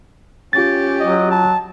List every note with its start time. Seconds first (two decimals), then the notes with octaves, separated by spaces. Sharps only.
0.53 C#4 F4 G4 A6
1.00 F#3 D#5
1.31 A5